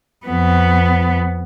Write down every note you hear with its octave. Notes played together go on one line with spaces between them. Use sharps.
F2 B3